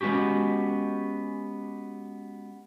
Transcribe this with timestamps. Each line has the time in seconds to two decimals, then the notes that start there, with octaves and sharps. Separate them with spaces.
0.01 G#3 B3 C#4 F#4 G4